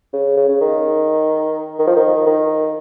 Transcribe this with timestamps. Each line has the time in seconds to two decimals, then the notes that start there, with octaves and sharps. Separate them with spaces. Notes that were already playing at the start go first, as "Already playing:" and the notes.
0.13 C#3
0.37 C#3
0.49 C#3
0.61 D#3
1.79 D#3
1.87 F3
1.97 D#3
2.26 D#3